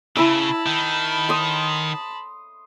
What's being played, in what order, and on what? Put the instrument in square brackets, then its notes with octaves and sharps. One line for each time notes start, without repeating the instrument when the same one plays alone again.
[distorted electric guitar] C#3 [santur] E4 E6 [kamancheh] A5 B5
[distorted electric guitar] D#3
[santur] C6 D#6